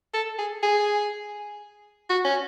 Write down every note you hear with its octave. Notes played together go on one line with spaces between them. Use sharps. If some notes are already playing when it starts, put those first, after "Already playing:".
A4
G#4
G#4
F#4
C#4